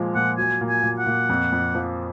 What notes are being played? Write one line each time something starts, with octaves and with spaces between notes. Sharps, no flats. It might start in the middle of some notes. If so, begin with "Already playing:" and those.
Already playing: A#2 F3 G#3
A#2 F#5
F#3 G#5
A#2
G#5
A#2
F#5
A#2
F2
F2
F3